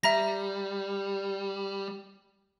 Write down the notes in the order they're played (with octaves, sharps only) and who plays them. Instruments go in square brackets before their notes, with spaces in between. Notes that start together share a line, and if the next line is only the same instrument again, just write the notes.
[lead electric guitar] G3 [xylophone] E5 A#5 A#6